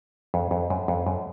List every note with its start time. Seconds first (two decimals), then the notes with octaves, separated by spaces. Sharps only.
0.34 F2
0.51 F2
0.70 F#2
0.88 F2
1.07 F#2